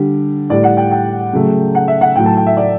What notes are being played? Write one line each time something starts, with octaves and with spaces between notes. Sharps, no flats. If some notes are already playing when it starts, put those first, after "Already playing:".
Already playing: D3 G3 G4
A2 G3 D5
F#5
G5
G5
C#3 F#3 A3
F#5
E5
F#5
A2 F#3 A3 G5
A5
G5
E5
D5